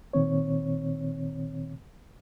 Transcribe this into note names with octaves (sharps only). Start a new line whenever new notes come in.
A#2 D#3 C4 C#5